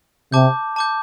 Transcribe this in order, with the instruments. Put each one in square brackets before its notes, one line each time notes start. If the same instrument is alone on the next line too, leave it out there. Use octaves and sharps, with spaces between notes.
[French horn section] C3 [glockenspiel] A5 D6 G6
[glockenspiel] A5 D6 G6